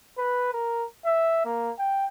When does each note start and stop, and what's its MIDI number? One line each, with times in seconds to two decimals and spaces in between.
0.17 0.47 71
0.53 0.84 70
1.05 1.40 76
1.45 1.71 58
1.78 2.06 79